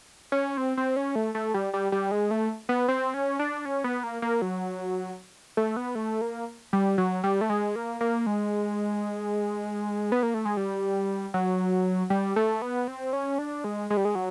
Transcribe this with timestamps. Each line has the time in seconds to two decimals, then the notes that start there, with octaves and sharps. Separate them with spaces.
0.32 C#4
0.57 C4
0.77 C4
0.96 C#4
1.15 A3
1.35 A3
1.54 G3
1.74 G3
1.92 G3
2.11 G#3
2.31 A3
2.69 B3
2.88 C4
3.14 C#4
3.39 D4
3.65 C#4
3.84 B3
4.03 A#3
4.22 A#3
4.42 F#3
5.57 A3
5.77 B3
5.95 A3
6.21 A#3
6.73 G3
6.98 F#3
7.24 G3
7.41 A3
7.50 G#3
7.76 A#3
8.01 A#3
8.26 G#3
10.12 B3
10.23 A#3
10.34 A3
10.45 G#3
10.57 G3
11.34 F#3
12.10 G3
12.36 A3
12.62 B3
12.88 C4
13.13 C#4
13.38 D4
13.64 G#3
13.90 G#3
13.97 G3
14.05 G#3
14.15 F#3